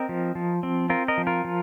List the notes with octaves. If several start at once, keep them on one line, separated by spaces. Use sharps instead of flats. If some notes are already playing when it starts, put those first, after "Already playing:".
Already playing: C4 A#4 D#5
F3
F3
C4
C4 F4 A#4
A#4 D#5
F3
F4 A#4
F3